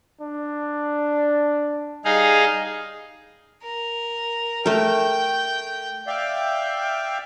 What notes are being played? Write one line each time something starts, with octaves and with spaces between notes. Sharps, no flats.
D4
G3 D#4 G#4 F5
A#4
A3 A#4 G5
D5 E5 F5 G5